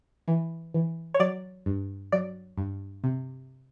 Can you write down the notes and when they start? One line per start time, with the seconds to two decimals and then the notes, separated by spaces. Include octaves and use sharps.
0.28 E3
0.74 E3
1.14 C#5
1.19 F#3 D5
1.66 G2
2.12 F#3 D5
2.58 G2
3.04 C3